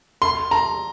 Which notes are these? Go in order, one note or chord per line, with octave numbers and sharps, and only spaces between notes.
C6
A#5